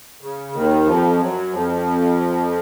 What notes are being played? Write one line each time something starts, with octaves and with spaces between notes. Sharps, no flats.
C#3
D#2 D#3
F2 F3
F#2 F#3
F2 F3